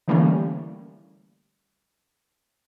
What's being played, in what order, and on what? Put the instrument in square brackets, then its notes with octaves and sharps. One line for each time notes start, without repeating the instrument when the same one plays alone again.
[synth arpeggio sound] D3 E3 G3 A3 A#3 C#4